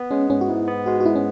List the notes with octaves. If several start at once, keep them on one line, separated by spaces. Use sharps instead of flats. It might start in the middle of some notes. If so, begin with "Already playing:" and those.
Already playing: B3
G#3 C#4
G#2 C#4
F#4
G#2 E4
B3
G#3 F#4
F#4
G#2 E4
C#4